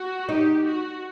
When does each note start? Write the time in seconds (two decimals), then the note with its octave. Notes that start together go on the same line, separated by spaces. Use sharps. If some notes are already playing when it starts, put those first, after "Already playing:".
Already playing: F#4
0.29 D#4 G4
0.66 F#4